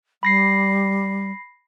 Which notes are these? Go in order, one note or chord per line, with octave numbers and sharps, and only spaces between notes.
G3 B5 A#6 C7